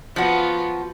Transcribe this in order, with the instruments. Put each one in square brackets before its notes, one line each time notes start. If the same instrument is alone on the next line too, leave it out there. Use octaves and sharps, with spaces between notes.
[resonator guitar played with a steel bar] F3 F#4 [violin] B3 F4